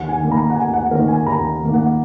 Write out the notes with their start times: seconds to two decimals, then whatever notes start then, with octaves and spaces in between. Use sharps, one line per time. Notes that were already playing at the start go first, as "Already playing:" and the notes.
Already playing: D#2 F#5
0.08 G#5
0.21 D#3 A#3
0.32 A#5
0.50 F#5
0.55 D#2 G#5
0.73 F#5
0.91 D#3 A#3 A#4
1.08 G#5
1.26 D#2 A#5
1.62 D#3 A#3
1.74 F#5